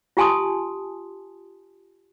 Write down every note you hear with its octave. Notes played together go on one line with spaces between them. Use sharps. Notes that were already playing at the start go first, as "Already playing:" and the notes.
F4 G4 G#5 A5 C6 D#6